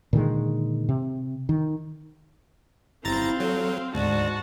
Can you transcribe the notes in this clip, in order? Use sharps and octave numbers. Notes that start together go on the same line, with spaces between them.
A#2 D3 D#3 G#3
C3
D#3
G1 C4 E4 F5 A#5 A6
F#3 A4
D2 G#2 F#4 D5 A5